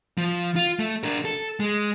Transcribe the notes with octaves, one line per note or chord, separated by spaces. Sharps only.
F3
F4
A3
D4 A#4
A4
G#3